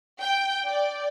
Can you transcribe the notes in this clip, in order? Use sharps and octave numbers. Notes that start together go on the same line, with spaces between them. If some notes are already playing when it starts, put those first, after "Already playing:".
G5
D5